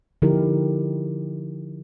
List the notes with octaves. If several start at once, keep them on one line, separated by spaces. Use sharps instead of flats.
D3 F3 D#4 E4 G4 A#4